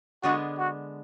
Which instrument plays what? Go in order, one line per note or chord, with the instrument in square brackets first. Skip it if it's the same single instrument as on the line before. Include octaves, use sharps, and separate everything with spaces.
[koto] D3 G#3 B3 D4 [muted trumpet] F#4
[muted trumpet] F#4